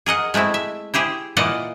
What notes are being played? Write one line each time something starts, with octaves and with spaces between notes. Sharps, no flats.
G#4 A#4 D#5 F#5
G#3 A3 C4 E4
E5
E4 G4 G#4 C5
A#2 E3 F4 D5 D#5 F#5